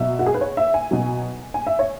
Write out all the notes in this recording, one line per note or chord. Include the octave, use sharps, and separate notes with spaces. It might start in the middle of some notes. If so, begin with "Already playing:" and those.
Already playing: B2 F#3 E5
F#4
G#4
B4
C#5
E5
G#5
B2 F#3
G#5
E5
C#5